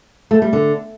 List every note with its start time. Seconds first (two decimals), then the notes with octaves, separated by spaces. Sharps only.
0.31 A3
0.42 G3
0.53 D3